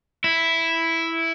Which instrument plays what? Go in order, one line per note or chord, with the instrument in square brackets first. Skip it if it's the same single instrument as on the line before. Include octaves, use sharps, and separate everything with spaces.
[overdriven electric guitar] E4